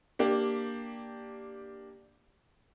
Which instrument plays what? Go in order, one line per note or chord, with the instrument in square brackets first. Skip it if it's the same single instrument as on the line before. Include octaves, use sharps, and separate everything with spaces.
[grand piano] A#3 D4 G4